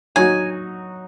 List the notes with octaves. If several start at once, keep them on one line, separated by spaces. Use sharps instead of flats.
F#3 D#4 F#4 G#5